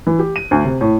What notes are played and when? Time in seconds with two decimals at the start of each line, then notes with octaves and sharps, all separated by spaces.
0.07 E3
0.19 G4
0.36 D#7
0.51 D2
0.65 C3
0.81 A2